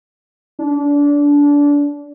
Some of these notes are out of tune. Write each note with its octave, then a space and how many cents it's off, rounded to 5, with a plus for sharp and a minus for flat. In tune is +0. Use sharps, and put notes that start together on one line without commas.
D4 -25